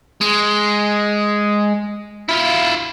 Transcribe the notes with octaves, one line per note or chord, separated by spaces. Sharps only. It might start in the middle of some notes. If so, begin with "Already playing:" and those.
G#3
E4 F4